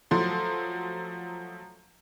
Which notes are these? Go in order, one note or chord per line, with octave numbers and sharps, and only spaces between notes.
F3 F#3 A3 C6